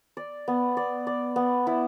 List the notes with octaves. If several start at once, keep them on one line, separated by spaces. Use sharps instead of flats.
D5
B3
D5
D5
B3
E4